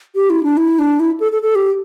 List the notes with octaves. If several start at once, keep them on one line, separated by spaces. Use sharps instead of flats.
G4
E4
D4
E4
D4
E4
A4
A4
A4
G4